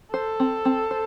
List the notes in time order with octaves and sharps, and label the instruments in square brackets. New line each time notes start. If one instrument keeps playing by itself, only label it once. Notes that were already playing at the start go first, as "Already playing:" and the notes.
[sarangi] A4 [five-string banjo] C5
[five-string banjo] C4
C4
C5